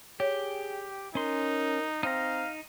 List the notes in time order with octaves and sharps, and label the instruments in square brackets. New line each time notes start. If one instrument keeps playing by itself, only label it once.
[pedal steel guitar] G4 [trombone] G#4 [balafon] C#5
[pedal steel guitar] C#4 C6 [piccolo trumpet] D#4 [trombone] A#4
[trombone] C4 [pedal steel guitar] D#4 A#5 [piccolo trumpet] F5